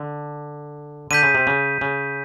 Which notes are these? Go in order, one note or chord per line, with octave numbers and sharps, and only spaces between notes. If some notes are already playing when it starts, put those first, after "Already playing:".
Already playing: D3
D3 G6 B6 D#7
C#3
C3
C#3
C#3